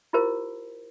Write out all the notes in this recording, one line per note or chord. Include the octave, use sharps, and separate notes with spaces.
E4 F4 G4 A#4 C5